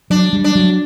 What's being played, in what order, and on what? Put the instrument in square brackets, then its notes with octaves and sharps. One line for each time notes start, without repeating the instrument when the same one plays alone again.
[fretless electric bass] F#3 [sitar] D4
[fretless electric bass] G3
[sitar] D4
[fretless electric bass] F#3